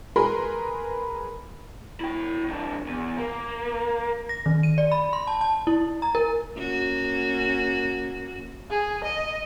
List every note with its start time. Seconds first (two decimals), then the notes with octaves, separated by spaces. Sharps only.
0.16 G#4 A#4 B4 B5 C6
2.01 E4 G5
2.48 F2 D4
2.87 E2
3.18 A#3
4.29 A#6
4.46 D#3
4.63 D#7
4.78 D5
4.92 B5
5.13 C6
5.27 A5
5.41 A5
5.67 E4
6.02 A#5
6.15 A#4
6.58 A#3 C#4 F#4
8.71 G#4
9.04 D#5